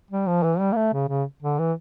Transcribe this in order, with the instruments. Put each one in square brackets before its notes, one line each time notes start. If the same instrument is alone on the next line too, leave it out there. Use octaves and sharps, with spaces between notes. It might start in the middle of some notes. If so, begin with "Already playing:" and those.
[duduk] G3
F3
E3
G3
A#3
A3
C#3
C#3
D3
E3